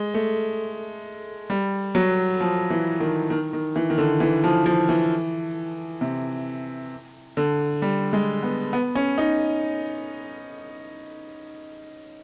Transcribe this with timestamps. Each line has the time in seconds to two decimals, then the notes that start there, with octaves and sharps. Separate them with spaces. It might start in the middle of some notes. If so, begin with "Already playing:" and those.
Already playing: G#3
0.14 A3
1.50 G3
1.95 F#3
2.40 F3
2.70 E3
3.00 D#3
3.30 D#3
3.53 D#3
3.76 E3
3.90 D#3
3.98 D3
4.20 E3
4.44 F3
4.66 F3
4.89 E3
6.01 C3
7.37 D3
7.82 G3
8.13 G#3
8.43 B3
8.73 B3
8.95 C#4
9.18 D#4